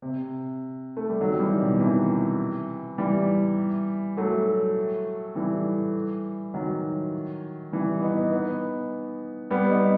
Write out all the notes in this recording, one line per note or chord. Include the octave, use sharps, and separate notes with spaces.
C3
A3
G3
D#3 F#3
E3 G3
B2 D#3
C3 E3
E3 G3
F#3 A3
E3 G3
D#3 F#3
E3 G3
B3 D#4
B3 D#4
G3 B3
B3 D#4